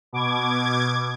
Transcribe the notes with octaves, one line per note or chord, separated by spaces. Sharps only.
B2 D6 G#6